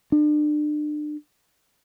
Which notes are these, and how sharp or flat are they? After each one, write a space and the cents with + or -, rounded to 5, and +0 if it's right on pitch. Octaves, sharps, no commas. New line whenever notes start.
D4 +35